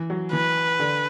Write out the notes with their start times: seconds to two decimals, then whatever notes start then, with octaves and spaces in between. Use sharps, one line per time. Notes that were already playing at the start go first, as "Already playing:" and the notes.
Already playing: E3
0.10 F#3
0.33 E3 B4
0.79 D3